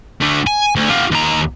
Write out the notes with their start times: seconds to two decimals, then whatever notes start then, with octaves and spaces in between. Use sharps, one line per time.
0.21 A3 D4
0.47 G#5
0.76 D2
0.89 F4 G4
1.11 D#2 A#5